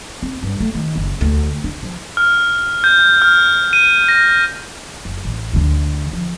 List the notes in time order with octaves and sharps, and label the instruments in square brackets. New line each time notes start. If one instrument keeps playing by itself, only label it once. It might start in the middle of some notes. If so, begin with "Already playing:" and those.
[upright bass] C4
G2
A3
D#3
F#1
D2
D4
F3
[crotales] F6
G6
F6
D#7
A#6
[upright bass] F#1
A1
D2 D3
F3